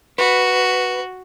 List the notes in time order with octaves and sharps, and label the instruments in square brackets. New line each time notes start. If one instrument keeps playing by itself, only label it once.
[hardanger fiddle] F#4 [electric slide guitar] B4